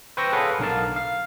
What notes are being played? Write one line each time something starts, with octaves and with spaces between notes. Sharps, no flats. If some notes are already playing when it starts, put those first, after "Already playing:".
B4 C5 G5 C#6 E6 A#6
G#4 A4 B4 C#5 F5 F#5
B1 D3 A#4 F5 A5
F5